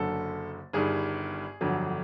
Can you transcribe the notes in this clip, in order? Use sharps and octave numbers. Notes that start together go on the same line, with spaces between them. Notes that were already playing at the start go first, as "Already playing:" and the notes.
Already playing: F#1 F#2 D3 A4
G1 G2 D#3 G#4
G1 F2 D3 F#3